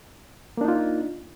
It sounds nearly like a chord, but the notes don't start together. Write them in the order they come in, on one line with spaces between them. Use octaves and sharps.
A#3 D4 D#4 F4